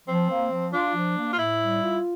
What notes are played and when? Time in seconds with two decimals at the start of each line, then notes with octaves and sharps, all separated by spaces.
0.07 F3 C4
0.29 A#3
0.51 F3
0.73 D4 F4
0.95 F3
1.17 A#3
1.33 F4
1.39 A2 E4
1.61 G3
1.83 F4